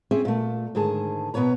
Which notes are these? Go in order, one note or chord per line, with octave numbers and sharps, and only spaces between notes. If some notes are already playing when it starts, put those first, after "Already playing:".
C4 C#4 G#4 E5
A#2 A3
G#2 D3 D#3 G#4 A5
B2 B3 B4 C#5 A#5